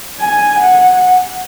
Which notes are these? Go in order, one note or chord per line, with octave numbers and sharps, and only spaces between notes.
G#5
F#5